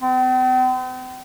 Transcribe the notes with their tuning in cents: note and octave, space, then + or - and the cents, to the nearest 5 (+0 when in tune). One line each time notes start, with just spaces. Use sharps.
C4 -45